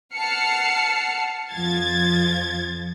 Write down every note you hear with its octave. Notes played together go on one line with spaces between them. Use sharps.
F#5 A5 F6 C7 C#7
F2 F3 G#6 A6